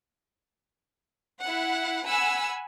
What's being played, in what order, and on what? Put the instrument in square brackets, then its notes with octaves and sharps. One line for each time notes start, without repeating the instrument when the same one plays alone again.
[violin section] E4 F#5
F#5 G#5 B5 E6